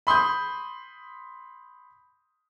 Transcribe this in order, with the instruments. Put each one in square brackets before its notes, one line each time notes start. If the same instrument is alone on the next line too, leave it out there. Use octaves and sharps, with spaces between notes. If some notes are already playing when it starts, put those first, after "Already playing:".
[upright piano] B5 C6 D#6 G6